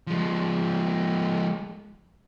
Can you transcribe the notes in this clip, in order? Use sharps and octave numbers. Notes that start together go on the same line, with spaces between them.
F3 G#3